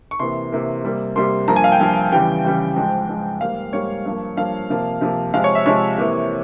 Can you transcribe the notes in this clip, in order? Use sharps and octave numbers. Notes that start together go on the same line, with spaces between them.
C#6
C3 E3 A#3 C6
C3 E3 A#3
C3 G3 A#3
C3 G3 A#3 C6
G2 F3 A#3 A#5
G#5
F5
G5
G2 F3 A#3
E2 C#3 E3 G3 G5
E2 C#3 E3 G3
G#2 F3 G#3
G#2 F3 G#3
G#2 G3 A#3 F5
G#2 G3 A#3 C#5
G2 F3 A#3
G2 F3 A#3 F5
C3 F3 A#3
C3 F3 A#3
C3 F3 G#3 F5
C#5
E5
C3 F3 G#3 C#5
C3 E3 A#3